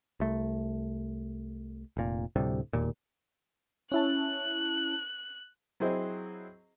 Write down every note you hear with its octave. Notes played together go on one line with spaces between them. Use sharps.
C2 A3
F1 A#2
D2 A2 C3 G3
E1 D#2 A#2
C#4 E4 A5 F#6
F#3 C4 E4 G#4 C5 D#5